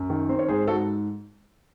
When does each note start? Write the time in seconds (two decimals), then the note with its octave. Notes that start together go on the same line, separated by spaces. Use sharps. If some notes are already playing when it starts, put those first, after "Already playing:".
Already playing: F#2
0.10 D#3
0.29 C4 C5
0.39 C#5
0.48 G#2 G#4 C5
0.67 G#2 F#4 A4